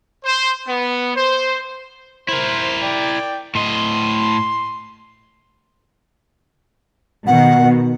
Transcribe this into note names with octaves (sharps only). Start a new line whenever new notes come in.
C5
B3
C5
E4 A#4 C5
D5 G5
A2 D#5 C6
B2 D#3 F#5